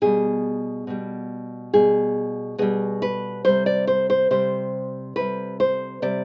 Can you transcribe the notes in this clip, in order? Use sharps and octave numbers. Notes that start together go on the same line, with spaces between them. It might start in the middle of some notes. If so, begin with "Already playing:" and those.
B2 G3 G#4
B2 G3
B2 G3 G#4
B2 G3 G#4
B4
C3 G3 C5
D5
C5
C5
C3 G3 C5
C3 G3 B4
C5
C3 G3 D5